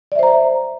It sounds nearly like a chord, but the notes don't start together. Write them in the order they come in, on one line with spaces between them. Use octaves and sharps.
D5 E5 C5 A#5